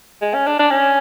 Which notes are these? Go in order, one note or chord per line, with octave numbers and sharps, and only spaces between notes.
G#3
C#4
D4
D4
C#4